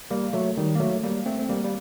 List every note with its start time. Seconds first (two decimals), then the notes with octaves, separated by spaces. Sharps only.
0.11 G3 A#3
0.33 F#3 A3
0.57 D#3 G3
0.75 A#3
0.79 F#3 A3
1.03 G3 A#3
1.26 A3 C4
1.39 C4
1.49 G3 A#3
1.64 G3